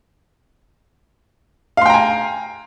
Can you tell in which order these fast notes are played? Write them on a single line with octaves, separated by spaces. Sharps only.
F5 C6 G5 A#5 G#5